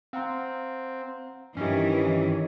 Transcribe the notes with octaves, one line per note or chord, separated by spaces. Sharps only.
C4 F5 F#5 A#5
G2 D#3 E3 C#4 G4